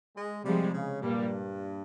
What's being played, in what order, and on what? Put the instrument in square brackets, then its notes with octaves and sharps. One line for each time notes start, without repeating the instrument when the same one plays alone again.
[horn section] G#3
[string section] C3 F3 G#3 [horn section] G3
[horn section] C#3
[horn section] G2 [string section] A#2 G3 A#3